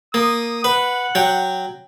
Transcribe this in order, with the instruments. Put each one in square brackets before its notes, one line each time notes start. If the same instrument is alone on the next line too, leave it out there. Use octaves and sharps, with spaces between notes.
[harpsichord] A#3 [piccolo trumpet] D#6
[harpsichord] B4 [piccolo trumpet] F#5
[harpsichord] F#3 G5